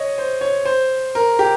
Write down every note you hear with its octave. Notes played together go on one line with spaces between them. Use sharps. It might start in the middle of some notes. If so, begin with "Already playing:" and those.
Already playing: C#5 D#5
C5
C#5
C5
A#4
G4